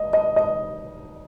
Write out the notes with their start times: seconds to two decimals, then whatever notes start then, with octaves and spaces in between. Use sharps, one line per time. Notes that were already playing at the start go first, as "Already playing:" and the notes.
Already playing: D#5
0.13 D#5
0.36 D#5